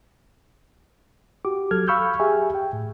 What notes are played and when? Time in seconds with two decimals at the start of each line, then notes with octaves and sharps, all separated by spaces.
1.45 F#4 G4 D6
1.71 F#3 A4 F6 G#6
1.88 F5 B5 C#6 E6 F6 G6
2.19 G4 G#4 E5 G#5
2.55 G5
2.73 A2